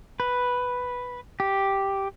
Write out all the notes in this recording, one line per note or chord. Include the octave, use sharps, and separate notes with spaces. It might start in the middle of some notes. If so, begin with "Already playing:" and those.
B4
G4